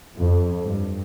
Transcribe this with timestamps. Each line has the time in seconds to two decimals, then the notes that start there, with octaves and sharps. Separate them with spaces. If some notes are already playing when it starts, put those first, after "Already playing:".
0.17 F2
0.63 G2